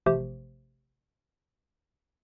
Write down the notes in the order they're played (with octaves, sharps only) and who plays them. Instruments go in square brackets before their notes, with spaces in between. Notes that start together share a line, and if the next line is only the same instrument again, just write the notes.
[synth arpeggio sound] A1 C3 F3 A3 G4 C5